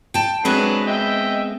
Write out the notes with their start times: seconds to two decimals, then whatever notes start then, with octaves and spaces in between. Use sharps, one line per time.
0.14 G5 A5
0.45 F#3 G#3 B3 C4 D4 B4
0.87 D#5 E5 G5